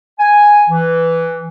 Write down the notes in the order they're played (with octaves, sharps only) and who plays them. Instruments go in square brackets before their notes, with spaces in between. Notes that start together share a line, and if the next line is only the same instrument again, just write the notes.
[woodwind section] G#5
E3